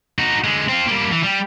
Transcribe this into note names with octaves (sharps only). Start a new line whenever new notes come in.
D#4 F#4
D3 G#3
C4 F4
G3 A#3
E3
G3